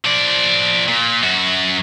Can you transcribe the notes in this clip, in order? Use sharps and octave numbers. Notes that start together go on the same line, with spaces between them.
F3 D5
A#2
F#2 F#4